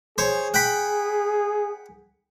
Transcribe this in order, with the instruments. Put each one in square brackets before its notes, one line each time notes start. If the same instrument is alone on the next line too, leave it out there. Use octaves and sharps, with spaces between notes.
[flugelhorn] G#4 [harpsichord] C5 C#5
[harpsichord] F#5 G5 B5